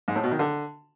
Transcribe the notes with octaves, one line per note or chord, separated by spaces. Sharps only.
G#2
A2
B2
D#3
D3